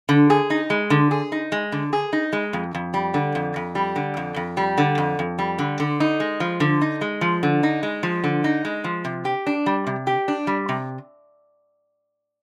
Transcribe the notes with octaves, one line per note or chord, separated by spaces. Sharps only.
D3
G#4
D#4
G#3
D3
G#4
D#4
G#3
D3
G#4
D#4
G#3
F2
F2
G3
D3
F2
F2
G3
D3
F2
F2
G3
D3
F2
F2
G3
D3
D3
D#4
G#3
F3
D3
D#4
G#3
F3
D3
D#4
G#3
F3
D3
D#4
G#3
F3
C3
G4
D4
G3
C3
G4
D4
G3
C3